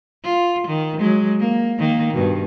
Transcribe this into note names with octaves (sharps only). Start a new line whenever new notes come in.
F4
D#3
F#3 G#3
A#3
D#3 A#3
G2 B2